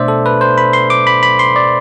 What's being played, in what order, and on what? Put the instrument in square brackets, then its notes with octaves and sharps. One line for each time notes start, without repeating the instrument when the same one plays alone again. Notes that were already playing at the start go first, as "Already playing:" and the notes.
Already playing: [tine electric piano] B2 A3 D4 C5 D5 E5
A4
B4
C5
B5
C6
D6
B5
B5
C6
D5